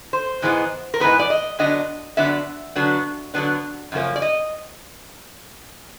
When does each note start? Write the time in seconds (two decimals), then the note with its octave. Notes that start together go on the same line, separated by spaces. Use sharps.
0.13 C5
0.42 G#2 E3 G#3 B3
0.94 A#4
1.00 G#2 E3 G#3 B3 B4
1.19 D5
1.30 D#5
1.58 D3 F#3 B3 D4 D#5
2.17 D3 F#3 B3 D4 E5
2.76 D3 F#3 B3 D4
3.34 D3 F#3 B3 D4
3.92 F#2 C#3 F3 A#3 C#4
4.16 D5
4.22 D#5